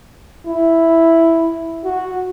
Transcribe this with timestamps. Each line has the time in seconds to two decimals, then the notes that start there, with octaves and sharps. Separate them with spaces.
0.46 E4
1.84 F#4